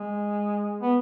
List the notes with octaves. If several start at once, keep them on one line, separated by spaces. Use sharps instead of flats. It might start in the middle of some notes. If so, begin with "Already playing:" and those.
Already playing: G#3
B3